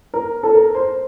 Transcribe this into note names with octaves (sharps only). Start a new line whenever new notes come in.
A#4
A4
A#4
C5